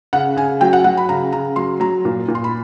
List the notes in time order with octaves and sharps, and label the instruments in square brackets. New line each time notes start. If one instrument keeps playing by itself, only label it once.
[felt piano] C#3 F#5
C#3 G#5
F#3 G5
F#5
F#3 F#5
B5
C#3 A#5
C#3 A#5
F#3 C6
F#3 A#5
A#2
A#2
C6
B5